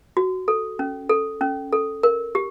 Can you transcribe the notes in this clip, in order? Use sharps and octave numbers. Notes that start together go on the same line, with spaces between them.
F#4
A4
C#4
A4
C#4
A4
A#4
G4